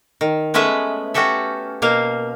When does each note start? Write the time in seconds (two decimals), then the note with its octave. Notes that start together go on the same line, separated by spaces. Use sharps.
0.21 D#3
0.54 G#3 A3 B3 C#4 B4 E5
1.14 C#4 F#4 G4 A4 E5
1.82 B2 A#3 F5